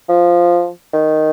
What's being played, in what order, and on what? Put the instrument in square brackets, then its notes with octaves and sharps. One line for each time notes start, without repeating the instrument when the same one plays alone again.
[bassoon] F3
D#3